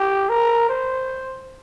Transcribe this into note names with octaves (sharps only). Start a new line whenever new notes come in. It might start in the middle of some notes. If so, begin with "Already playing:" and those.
Already playing: G4
A#4
C5